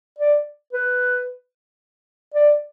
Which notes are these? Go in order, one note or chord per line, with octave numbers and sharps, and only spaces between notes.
D5
B4
D5